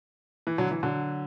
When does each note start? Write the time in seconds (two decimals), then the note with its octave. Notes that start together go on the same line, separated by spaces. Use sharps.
0.47 E3
0.58 D3 F#3
0.71 E3
0.83 D3 F#3